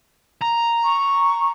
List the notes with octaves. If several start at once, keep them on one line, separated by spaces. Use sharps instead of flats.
A#5
C#6